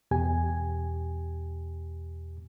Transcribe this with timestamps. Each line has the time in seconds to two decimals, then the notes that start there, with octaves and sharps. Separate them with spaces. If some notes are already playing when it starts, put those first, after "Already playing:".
0.11 E2 B2 G4 G#5